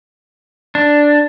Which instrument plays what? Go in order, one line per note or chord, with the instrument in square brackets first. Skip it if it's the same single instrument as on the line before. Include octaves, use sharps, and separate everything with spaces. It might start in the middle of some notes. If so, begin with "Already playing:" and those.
[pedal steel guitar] D4